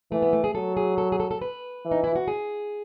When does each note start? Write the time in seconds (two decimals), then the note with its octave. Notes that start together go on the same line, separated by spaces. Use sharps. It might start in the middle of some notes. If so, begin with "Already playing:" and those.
0.11 E3 A3
0.22 B3
0.33 A3
0.44 G#4
0.54 F#3 A4
0.77 G#4
0.98 A4
1.12 G#4
1.20 A4
1.31 A4
1.41 B4
1.85 E3
1.91 D#4
2.04 E4
2.15 F#4
2.28 G#4